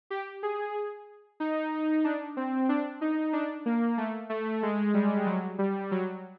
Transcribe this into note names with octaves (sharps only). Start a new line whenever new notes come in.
G4
G#4
D#4
D4
C4
D4
D#4
D4
A#3
A3
A3
G#3
G3
F#3
G3
F#3